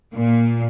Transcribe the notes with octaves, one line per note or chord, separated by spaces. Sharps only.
A#2